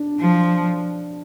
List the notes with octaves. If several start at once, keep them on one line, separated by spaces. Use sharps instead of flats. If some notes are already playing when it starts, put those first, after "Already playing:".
Already playing: D4
F3